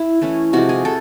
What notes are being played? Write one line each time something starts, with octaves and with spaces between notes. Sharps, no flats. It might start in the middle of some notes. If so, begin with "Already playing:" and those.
Already playing: E4
E3 A3 C#4
C3 F3 G#3 F#4
G#4
C3 A4